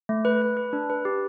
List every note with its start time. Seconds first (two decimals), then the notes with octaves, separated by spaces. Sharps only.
0.09 A3
0.25 B4
0.42 B4
0.57 B4
0.73 D4
0.90 B4
1.05 G4